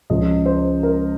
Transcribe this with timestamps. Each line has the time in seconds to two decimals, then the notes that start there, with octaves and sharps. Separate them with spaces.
0.10 C#2 C#3 F3 D#5
0.46 C5
0.83 A#4